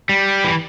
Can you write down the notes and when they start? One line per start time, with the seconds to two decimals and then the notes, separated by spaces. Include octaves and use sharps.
0.09 G3
0.44 E3